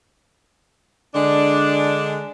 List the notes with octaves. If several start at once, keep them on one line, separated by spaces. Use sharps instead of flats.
D3 G#3 D4